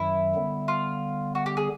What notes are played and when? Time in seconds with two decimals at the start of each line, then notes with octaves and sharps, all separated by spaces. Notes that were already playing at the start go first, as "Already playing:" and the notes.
Already playing: F#2 D#3 F#3 E4
0.35 D3 G3 B3
0.68 F4
1.35 F#4
1.46 G4
1.57 G#4